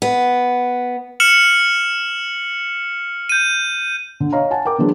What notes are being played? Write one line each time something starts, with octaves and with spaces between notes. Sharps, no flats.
B3
F6 C#7 E7 F#7
G6 D#7
D3
C#5 D#5 F5 A#5
F#5 G#5 A5
A#4 G5 D6
D3 E3 F#3 G#3 D4 E4